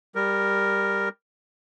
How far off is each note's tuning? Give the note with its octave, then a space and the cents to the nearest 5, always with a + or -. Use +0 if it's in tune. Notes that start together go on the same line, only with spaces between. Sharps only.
G3 +10 A#4 +0